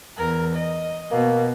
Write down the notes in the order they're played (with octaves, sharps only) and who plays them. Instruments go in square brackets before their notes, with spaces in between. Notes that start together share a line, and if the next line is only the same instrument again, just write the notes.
[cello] E2 A#4
D#5
[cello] B2 [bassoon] A#3